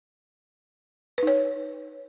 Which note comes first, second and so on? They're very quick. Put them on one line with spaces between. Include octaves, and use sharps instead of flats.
B4 D#4 C#5